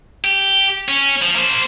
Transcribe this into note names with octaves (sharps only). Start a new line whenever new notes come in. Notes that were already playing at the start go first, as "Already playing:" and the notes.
G4
C#4
F3
A#3 C5